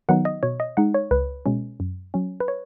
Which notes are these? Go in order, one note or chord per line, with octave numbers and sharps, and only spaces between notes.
D#3 F#3 B3 D#4 F#5
D#5
B2 C#5
D#5
G#3 D#4 F#5
C#5
C#2 B4
B2 G#3 C#4
F#2
F#3 C#4
B4
C#5